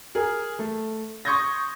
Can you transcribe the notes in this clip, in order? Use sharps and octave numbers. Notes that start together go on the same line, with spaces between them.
G#4 A#4
A3
C6 C#6 D#6 G6 G#6 A#6